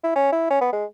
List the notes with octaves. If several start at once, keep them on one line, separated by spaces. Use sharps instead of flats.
E4
C#4
E4
C#4
B3
G#3